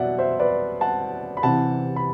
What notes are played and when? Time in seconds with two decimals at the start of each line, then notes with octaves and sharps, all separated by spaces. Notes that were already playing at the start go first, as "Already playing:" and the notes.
Already playing: B2 F#3 D5 E5 F#5
0.19 C5 E5
0.39 B4 D5
0.81 F#5 A5
1.37 B5
1.43 C3 E3 F#5 A5
1.96 B5